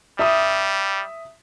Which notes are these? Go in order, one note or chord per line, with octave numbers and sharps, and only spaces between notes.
G3 E5 D#6